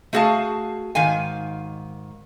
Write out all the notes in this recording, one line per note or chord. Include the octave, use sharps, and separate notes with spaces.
A3 F#4 G#4 F5 A5
G#2 D#3 F5 G#5